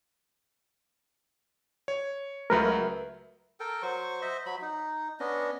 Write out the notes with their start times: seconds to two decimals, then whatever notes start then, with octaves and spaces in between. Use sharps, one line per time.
1.88 C#5
2.50 C#2 F#3 A3 A#4 B4 E5
3.60 A4 A#4 G5
3.83 F#3 C5 C#6
4.22 C5 D#5 E5
4.46 F#3 B5
4.62 D#4
5.20 B3 C#4 D4 D#5